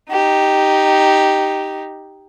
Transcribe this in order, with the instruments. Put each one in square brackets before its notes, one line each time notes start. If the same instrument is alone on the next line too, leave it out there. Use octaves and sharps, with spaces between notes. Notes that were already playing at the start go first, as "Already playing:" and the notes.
[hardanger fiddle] D#4 G4